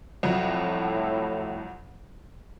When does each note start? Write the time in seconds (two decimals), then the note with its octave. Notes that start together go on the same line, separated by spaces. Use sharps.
0.23 C2 F2 A2 F#3